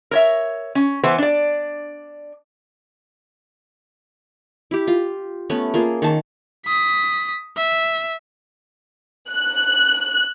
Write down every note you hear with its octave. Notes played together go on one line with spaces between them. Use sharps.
A#4 C#5 E5
C#4
E3 B3 B4 C5
D4 D5
E4 G4
F4
A3 B3 C#4
A#3 F4 G#4
D#3 A5 C#6
D#6 B6
E5
F#6